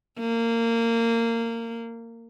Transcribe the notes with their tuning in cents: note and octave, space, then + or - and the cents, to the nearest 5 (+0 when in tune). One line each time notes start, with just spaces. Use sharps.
A#3 -20